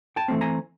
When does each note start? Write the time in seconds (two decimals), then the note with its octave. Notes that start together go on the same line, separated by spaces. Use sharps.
0.16 G5 A5
0.28 E3 A3 C4
0.41 G#5 A#5